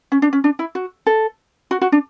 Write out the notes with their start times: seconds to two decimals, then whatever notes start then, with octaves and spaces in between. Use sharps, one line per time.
0.12 C#4
0.22 D4
0.33 C#4
0.44 D4
0.59 E4
0.75 F#4
1.07 A4
1.71 F#4
1.82 F#4
1.92 D4